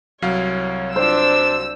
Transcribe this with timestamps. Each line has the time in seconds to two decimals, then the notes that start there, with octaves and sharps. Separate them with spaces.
0.22 C2 F#3 C#5 F5
0.96 D4 C5 E6